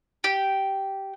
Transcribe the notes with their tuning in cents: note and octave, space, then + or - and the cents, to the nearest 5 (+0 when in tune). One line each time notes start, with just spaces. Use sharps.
G4 -10